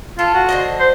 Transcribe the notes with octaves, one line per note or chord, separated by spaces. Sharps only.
F4 A4
F#4
D3 C5 D#5
C5